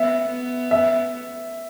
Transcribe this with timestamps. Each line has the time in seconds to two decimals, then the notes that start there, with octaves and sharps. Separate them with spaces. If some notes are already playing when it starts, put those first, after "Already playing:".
Already playing: B3 E5
0.30 B3
0.71 E5